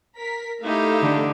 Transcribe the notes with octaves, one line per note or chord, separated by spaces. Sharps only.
A#4 B6
A3 D#4 E4 G4 F5
D3